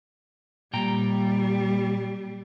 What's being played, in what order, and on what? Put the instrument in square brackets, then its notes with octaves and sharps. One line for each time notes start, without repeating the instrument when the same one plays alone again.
[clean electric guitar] A#2 G5 A#5 [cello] G3